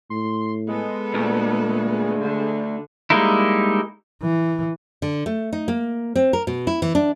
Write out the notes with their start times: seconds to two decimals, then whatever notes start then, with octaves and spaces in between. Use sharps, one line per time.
0.10 A2 C6
0.68 G#3 B3 A4
1.14 D2 A#2
2.20 D3
3.10 G3 G#3 A#3 D#4 E4
4.22 E3
5.02 D3
5.26 A3
5.53 D#4
5.68 A#3
6.16 C4
6.33 A#4
6.47 B2
6.67 E4
6.82 E3
6.95 D4